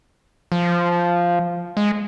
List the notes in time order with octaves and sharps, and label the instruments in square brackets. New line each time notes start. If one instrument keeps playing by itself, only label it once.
[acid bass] F3
G#3